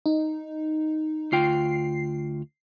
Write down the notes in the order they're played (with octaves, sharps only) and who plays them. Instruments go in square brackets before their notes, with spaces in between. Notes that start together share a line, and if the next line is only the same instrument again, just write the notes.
[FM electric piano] D#4
[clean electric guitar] D2 F4 G5 [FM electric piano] C7